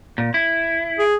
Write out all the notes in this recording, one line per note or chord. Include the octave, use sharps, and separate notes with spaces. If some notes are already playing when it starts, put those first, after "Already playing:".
A#2
E4
G#4